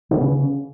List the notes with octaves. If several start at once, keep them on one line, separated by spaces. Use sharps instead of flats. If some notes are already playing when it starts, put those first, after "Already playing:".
D3
B3
C#3